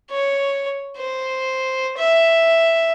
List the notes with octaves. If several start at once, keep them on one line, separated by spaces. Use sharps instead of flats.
C#5
C5
E5